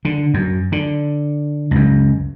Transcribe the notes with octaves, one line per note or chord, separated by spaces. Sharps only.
D3
F#2
D3
C#2 F#2